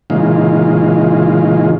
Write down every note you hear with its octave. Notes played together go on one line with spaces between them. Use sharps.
A#2 C#3 E3 G#3 D#4 F4